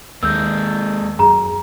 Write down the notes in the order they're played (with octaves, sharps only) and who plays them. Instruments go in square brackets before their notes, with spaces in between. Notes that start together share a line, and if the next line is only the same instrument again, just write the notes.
[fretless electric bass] D#2 [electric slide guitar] G#3 A#3 [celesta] E6 G6
[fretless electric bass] F#2 [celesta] G#4 [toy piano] A#5